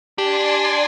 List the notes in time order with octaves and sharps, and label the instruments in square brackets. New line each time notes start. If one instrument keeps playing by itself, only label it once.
[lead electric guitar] D4 [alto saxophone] G4 [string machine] D5 G#5 C6